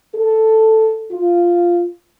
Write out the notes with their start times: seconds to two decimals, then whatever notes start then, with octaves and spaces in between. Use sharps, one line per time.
0.15 A4
1.12 F4